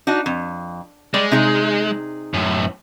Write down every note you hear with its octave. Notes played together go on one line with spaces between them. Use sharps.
D4 D#4 F#4
F2
G3 G#3 D5
C3 D#4 G#4
F#2 A2